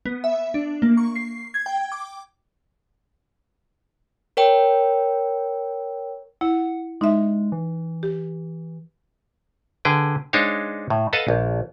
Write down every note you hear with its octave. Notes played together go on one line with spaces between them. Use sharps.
B3
E5
D4
A#3
C#6
C7
G#6
G5
D6
A#4 C#5 G5
E4 F#5
G#3 D#4 E5
E3
G4
D3 G#4 B4 G5
G#3 D4 D#4 C5 C#5 F5
A2
A4 B4 D#5 F5 F#5 A5
A#1